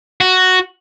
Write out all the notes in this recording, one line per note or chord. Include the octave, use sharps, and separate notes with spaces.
F#4